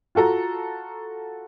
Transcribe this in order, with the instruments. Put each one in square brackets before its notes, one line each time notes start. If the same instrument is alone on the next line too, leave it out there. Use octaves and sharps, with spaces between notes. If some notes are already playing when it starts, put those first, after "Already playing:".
[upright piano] F4 F#4 A4 A#5